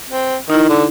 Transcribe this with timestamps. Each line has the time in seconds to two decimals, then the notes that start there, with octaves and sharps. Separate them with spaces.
0.10 C4
0.50 D#3 D#4 E4
0.69 D3